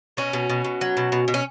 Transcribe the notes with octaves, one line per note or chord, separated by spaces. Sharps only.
B2 C#4 F#4
B2
B2
B2
F#3
B2
B2
B2
C#4